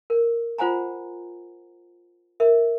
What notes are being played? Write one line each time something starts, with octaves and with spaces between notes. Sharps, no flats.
A#4
F4 C5 F#5 G#5 A#5
A#4 E5